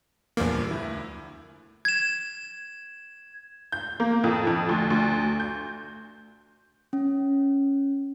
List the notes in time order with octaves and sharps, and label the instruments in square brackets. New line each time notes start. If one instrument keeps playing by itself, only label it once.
[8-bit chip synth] E2 A#3 [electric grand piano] G2 A#2 F3
[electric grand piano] D2 E4
[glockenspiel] G#6 E7
[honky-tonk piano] G6
A#3
F2
F2
D2
D2
G6
[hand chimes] C#4